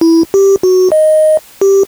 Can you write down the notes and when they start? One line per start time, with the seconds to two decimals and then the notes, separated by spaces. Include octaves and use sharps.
0.01 E4
0.34 G4
0.63 F#4
0.92 D#5
1.61 G4